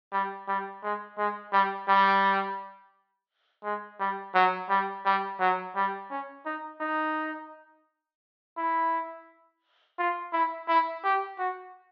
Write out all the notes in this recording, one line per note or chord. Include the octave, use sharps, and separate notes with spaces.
G3
G3
G#3
G#3
G3
G3
G#3
G3
F#3
G3
G3
F#3
G3
C#4
D#4
D#4
E4
F4
E4
E4
G4
F#4